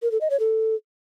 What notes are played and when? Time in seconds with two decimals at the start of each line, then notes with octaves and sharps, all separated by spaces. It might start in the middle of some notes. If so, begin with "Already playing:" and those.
0.02 A#4
0.12 A4
0.21 D#5
0.30 C#5
0.40 A4